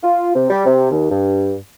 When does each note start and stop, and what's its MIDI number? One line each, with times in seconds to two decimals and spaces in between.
0.03 0.35 65
0.35 0.45 48
0.50 0.62 55
0.66 0.88 48
0.91 1.07 39
1.10 1.53 43